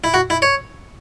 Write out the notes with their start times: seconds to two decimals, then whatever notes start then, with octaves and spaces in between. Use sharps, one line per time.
0.04 E4
0.14 F#4
0.30 E4
0.42 C#5